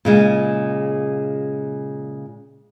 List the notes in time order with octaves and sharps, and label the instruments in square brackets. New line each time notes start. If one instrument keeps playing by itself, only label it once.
[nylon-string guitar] A#2 C#3 G#3